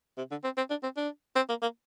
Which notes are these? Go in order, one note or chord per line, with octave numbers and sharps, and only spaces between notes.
C3
D3
C4
C4
D4
C4
D4
C4
A#3
A#3